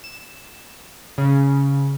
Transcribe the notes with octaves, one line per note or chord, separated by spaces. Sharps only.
E7
C#3